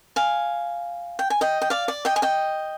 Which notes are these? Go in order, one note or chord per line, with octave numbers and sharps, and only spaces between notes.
F5 G#5
G5
G#5
D#5 G5
G5
D5 F5
D5
D#5 G5
G#5
D#5 G5